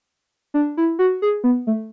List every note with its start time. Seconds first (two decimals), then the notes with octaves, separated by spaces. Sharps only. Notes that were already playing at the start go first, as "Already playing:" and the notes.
0.54 D4
0.77 E4
0.99 F#4
1.22 G#4
1.44 B3
1.67 A3